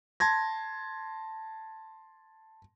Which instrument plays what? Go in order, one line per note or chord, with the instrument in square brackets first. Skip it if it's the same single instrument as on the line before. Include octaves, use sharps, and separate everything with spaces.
[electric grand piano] A5 C6 G#6 A#6